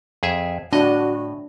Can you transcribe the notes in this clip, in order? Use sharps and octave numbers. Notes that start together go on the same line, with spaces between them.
F2 G#4 E5
A2 D4 F#4 D#5